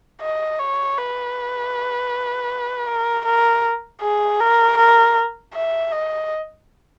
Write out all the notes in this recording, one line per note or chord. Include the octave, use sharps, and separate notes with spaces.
D#5
C#5
B4
A#4
A#4
G#4
A#4
A#4
E5
D#5